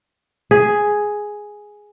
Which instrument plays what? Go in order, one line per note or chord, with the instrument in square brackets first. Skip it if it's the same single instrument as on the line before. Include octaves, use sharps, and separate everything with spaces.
[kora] G#4